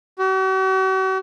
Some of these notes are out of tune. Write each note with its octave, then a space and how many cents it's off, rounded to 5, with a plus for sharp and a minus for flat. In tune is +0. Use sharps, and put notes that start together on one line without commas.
F#4 +45